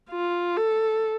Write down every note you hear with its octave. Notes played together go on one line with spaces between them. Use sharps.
F4
A4